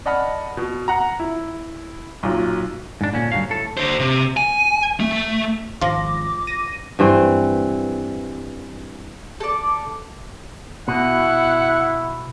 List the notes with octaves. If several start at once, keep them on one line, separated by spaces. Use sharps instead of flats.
D5 D#5 F#5 A5 B5 F6
B2
F#5 A#5
E4
B1 A#2 F#3
G#2 D4
A#2 D3 C#4
D2 G2 F#3 F5
A2 A4
D3 C5
C3
G#5
A3
G#1 F3 F4 D6 A#6
A#6 D#7
G2 E3 C4
A4 D5
B2 E4 F#5